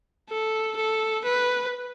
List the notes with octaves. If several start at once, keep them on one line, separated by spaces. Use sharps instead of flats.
A4
A4
B4